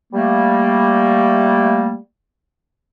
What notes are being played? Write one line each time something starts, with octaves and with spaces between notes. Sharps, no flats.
G3 A3 A#3